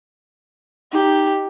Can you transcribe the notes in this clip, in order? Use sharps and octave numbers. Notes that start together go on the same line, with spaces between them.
D#4 G4